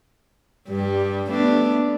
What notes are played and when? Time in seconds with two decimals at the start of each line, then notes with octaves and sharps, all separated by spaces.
0.68 G2 G3
1.30 A3 B3 D4